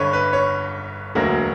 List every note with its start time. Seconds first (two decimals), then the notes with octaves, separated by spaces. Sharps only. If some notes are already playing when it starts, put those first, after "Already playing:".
Already playing: G1 G2 D3 B4 C#5
0.13 B4
0.33 C#5
1.15 E1 D2 D3 F#3 A#3